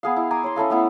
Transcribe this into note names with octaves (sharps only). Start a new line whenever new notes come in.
B3 G#4 F5
E4
G#5 A#5 D6
C#5 C6
C#4 E4 A4 F5
A3 B3 E4